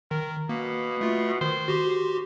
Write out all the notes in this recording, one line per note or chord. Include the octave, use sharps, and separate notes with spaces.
D#3 A#4
B2 A#3
A3 F4
D#3 C5
F#4 G4 C6